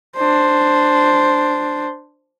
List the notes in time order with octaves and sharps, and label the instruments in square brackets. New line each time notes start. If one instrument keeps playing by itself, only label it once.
[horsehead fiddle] D4 C5